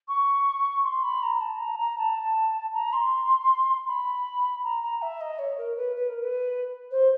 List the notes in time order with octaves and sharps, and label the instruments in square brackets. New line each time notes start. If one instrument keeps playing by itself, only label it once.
[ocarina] C#6
C6
B5
A#5
A5
A#5
A#5
A5
A#5
C6
B5
A#5
A#5
E5
D#5
C#5
A#4
B4
B4
A#4
B4
C5